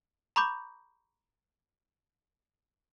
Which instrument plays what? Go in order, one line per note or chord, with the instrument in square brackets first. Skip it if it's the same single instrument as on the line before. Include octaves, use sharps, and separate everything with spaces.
[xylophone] A#5 B5 C#6 D6 G6